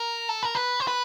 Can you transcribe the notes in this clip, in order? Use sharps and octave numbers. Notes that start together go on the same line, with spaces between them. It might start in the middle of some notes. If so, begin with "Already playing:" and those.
Already playing: A#4
A4
A#4
B4
C5
B4